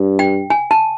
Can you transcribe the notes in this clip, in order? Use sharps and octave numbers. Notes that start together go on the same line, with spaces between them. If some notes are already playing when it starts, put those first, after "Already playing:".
Already playing: G2
G5
G#5
A5